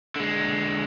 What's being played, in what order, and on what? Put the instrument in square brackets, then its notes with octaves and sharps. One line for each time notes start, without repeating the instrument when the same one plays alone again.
[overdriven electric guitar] D3 G#3